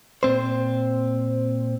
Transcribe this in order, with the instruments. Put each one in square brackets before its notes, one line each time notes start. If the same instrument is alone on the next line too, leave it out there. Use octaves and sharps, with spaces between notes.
[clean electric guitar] A#2 C4 C5